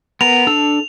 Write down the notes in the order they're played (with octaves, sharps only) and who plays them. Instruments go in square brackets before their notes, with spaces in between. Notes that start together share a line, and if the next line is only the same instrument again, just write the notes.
[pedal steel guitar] B3 A#4 B4 [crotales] F7
[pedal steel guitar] D4 A4 E6